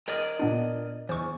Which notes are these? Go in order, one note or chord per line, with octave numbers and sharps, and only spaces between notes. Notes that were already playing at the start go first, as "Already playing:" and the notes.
A#4 D5 D#5
A#2 B3 D4
E2 C5 C#6